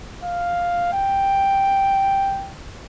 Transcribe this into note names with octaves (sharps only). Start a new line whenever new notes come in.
F5
G5